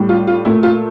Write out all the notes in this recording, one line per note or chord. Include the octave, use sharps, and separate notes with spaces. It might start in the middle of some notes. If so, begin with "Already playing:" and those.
Already playing: A2 G3
F4
F4
A#2 A3 E4
F4